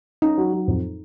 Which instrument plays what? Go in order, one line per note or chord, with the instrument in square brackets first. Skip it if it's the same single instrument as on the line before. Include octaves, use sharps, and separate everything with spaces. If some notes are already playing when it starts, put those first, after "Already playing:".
[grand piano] C#4 [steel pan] D#4
[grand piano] F#3
F#3
F2